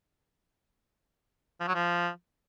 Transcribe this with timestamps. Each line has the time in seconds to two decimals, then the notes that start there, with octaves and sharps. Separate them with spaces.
1.60 F3
1.67 F#3
1.75 F3